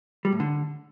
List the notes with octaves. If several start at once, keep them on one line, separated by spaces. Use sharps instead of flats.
G3
A2
D3